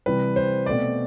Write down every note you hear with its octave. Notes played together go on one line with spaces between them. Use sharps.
C3 E3 G3 B4
C5
B2 A3 C4 D5